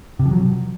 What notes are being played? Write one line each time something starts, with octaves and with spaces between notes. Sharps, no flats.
C3
F3
F#3